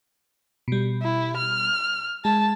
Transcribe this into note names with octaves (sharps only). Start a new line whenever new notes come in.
B2 G3
E4
F6
G#3 A5